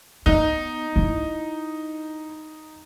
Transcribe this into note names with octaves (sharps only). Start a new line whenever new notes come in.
B3 D#4
E4